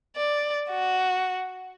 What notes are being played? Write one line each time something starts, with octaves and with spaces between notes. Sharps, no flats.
D5
F#4